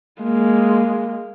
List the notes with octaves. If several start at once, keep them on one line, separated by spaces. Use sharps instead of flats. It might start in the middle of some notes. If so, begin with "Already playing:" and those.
G#3 A#3